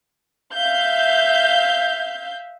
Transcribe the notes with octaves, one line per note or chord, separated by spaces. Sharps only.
E5 F5 G6